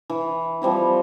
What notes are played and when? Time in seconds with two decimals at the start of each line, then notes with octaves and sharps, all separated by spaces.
0.10 E3
0.62 F3 G3 C4 E4